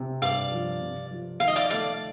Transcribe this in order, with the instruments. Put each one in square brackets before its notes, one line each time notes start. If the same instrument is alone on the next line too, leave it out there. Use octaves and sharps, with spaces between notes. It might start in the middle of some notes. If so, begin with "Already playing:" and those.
Already playing: [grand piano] C3
[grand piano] G2 [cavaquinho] D5 F5
[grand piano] F3
C3
F3
[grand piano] D#3 [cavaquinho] F5
[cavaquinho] D#5
D5 F5
[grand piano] A3 [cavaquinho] D5 F5